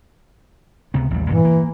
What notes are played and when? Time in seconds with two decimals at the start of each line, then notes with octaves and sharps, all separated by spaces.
0.94 C#2 C3 B3
1.11 A1 D#2 G3
1.29 G2 A#2 E3 A#3
1.45 A#3